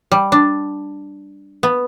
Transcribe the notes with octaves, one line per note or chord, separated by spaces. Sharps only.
G3
D4
B3